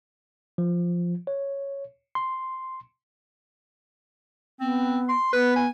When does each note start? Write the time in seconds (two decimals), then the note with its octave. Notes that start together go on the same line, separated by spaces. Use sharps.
0.58 F3
1.27 C#5
2.15 C6
4.60 B3 C4
5.09 C6
5.33 B3 B4
5.56 G#5